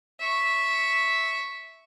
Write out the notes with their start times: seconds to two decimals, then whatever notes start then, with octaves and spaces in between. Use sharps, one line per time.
0.20 E5 C#6